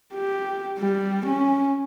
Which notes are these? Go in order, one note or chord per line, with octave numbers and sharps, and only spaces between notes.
G4
G3
C#4